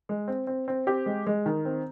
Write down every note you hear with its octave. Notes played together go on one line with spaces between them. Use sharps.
G#3
C4
C4
C4
C4 G4
G#3
G#3
D#3
C4